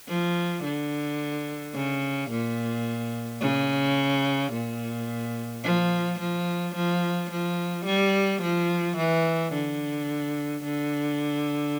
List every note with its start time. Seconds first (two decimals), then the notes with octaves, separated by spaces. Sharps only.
0.08 F3
0.64 D3
1.75 C#3
2.31 A#2
3.41 C#3
4.53 A#2
5.64 F3
6.20 F3
6.76 F3
7.31 F3
7.86 G3
8.42 F3
8.97 E3
9.53 D3
10.64 D3